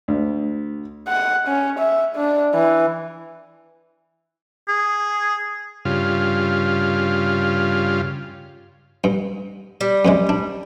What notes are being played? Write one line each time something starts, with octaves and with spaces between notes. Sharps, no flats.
D2
F#5
C#4
E5
D4
E3
G#4
G2 C#3 F4
G2
G3
F#2 C3 G#3
D4